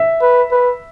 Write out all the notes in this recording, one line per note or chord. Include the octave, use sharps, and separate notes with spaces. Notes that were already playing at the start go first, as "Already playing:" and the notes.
Already playing: E5
B4
B4